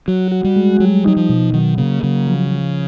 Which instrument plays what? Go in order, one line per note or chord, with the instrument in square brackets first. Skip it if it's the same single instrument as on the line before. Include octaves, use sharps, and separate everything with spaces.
[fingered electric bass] F#3 [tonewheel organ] F#4
[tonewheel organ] F#4
[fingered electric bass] G3
[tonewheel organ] G#3
[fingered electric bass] F#3 [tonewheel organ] G3
[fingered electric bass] F#3 [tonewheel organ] D#4
[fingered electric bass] F3
[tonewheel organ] B2
[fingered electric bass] D#3 [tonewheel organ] F#3
[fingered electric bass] C#3 [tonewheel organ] A#3
[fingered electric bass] C#3 [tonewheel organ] F#3
[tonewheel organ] F3
F3